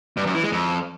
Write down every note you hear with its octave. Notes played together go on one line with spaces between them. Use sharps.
G2
F#2
E3
G#3
F2